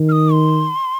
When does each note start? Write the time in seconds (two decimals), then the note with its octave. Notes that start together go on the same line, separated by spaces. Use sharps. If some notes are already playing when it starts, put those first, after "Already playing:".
Already playing: D#3
0.09 F6
0.12 D#6
0.32 C6